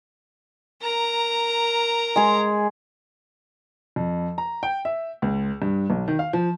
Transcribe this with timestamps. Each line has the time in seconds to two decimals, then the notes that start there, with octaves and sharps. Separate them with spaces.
0.82 A#4 A#5
2.16 G#3 G#4
3.96 F2
4.38 A#5
4.63 G5
4.85 E5
5.22 C#2
5.62 G2
5.90 B1
6.08 D#3
6.19 F5
6.33 F3